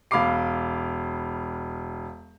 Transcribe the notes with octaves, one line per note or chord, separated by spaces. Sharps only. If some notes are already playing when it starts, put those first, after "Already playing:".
E1 F5 B5 D6 C7